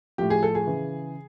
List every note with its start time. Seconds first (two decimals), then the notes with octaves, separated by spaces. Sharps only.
0.18 A2 F3 G4
0.30 G#4
0.43 A4
0.55 G#4
0.66 C#3 E3